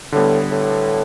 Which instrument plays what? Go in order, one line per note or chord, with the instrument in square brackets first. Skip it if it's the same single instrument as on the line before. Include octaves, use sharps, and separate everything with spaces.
[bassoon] A2 [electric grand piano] D3 G3 B3
[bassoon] A2